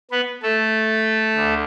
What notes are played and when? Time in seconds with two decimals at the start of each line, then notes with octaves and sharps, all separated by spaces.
0.11 B3 B4
0.42 A3 A4
1.35 D2